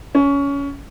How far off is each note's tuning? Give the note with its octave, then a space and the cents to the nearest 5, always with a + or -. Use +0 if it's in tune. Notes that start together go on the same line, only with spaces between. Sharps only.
C#4 +20